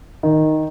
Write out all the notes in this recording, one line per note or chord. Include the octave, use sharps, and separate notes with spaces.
D#3